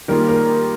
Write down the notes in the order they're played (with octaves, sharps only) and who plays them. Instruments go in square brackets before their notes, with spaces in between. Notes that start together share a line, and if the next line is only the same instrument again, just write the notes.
[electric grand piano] D#3 G3 A#3 F4 G#4 [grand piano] A#4
[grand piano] A#4